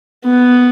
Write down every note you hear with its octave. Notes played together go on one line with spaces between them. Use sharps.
B3